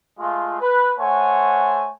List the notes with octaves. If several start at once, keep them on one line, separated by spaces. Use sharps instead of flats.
G#3 A3 F4
B4
A3 C5 C#5 F#5 G#5